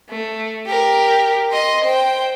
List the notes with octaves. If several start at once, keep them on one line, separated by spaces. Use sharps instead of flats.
A3
G4 A#4
D#5 C6
C5 G5